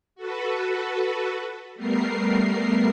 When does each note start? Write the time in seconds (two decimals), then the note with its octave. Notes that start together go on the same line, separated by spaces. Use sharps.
0.16 F#4 A4 B4
1.75 G3 A3 B3 A#4 C7